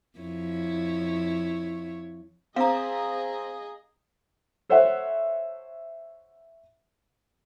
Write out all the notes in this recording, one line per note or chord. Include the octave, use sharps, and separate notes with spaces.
F2 E4 C#5
C4 G#4 D#5 F5 A#5
A4 C5 C#5 E5 F#5